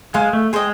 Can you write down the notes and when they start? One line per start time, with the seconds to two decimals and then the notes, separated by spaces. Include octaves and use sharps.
0.14 G#3 C5 F5 G#5
0.33 A3
0.53 G#3 G#4 C5 D#5 G5